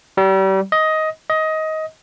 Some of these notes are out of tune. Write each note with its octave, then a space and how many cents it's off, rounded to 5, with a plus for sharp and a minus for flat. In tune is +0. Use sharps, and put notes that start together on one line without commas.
G3 -35
D#5 +15
D#5 +20